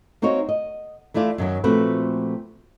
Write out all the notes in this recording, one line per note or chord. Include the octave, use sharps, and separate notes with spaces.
A#3 C4 D#4 F#4 C#5
D#5
E3 A3 E4 F4 D5
F#2 D#3 F#3
A#2 F3 A3 C4 F#4 B4